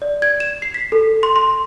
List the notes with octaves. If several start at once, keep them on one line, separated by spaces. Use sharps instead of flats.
D5
G#6
E7
C7
B6
A4
C6
C6